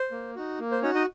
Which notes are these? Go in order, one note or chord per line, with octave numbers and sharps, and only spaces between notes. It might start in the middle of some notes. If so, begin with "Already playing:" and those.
Already playing: C5
A#3
D#4 F#4
A#3
C5
C#4 D#4 F#4 C#5
D#4 D#5